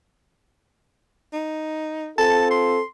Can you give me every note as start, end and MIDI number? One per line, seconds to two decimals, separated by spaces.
1.33 2.10 63
2.18 2.78 60
2.18 2.78 65
2.18 2.78 69
2.18 2.50 81
2.51 2.86 84